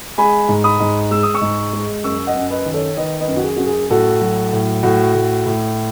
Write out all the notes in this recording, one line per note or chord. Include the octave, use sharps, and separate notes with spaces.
G#3 G#5 B5
G#2
B5 D#6
G#2
G#3 E6
D#6
C#6 E6
G#2
G#3
F#2 C#6 E6
D#5 F#5
F#2
B4 D#5
D#3
A4 C#5
D#3 B4 D#5
B4 D#5
F#2
F#4
G#4
F#2 F#4
G#4
A2 F#4 A4
F#3
A2
A2 F#4
A2
A2